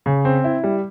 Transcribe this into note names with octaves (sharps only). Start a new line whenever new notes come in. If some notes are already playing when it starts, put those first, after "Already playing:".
C#3
C4
E4
G3